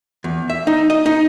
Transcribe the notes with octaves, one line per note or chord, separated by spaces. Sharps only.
E2
E5
D#4
D#5
D#4